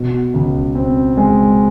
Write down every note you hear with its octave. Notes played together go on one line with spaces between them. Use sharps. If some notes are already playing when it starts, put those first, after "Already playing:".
Already playing: B2
C#2
C4
G#3